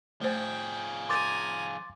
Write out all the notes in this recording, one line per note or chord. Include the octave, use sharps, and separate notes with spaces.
F3 A3 G#4 C5 G5
G#5 A#5 C6 D6 A6